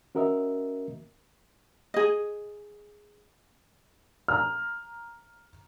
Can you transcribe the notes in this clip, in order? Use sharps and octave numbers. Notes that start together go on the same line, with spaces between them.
C#4 F#4 A#4 D#5 E5
G#4 D#5
A#5 F6